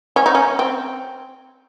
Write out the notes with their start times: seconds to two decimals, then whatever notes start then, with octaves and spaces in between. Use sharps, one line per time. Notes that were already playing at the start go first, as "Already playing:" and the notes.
0.16 C#4
0.26 D#4
0.35 C#4
0.59 C4